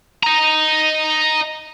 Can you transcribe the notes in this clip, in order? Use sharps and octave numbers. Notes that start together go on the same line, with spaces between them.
D#5 A#5